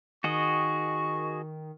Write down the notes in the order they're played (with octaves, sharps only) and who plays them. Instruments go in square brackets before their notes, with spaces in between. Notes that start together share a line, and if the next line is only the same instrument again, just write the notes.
[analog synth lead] D#3 [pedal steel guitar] F#4 G#4 D#5 [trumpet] C#6